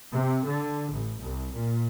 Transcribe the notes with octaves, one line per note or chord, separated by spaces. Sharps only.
C3
D3
A1
C2
A#2